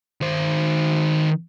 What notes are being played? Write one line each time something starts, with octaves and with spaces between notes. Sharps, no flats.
D#3 C5